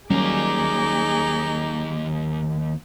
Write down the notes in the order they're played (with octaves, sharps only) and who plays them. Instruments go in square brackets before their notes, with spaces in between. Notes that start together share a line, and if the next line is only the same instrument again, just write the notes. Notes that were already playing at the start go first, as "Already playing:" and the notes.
[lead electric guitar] D#2 A#3 [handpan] F#3 G3 C#4 [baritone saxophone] D#4 [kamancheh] G#4 D6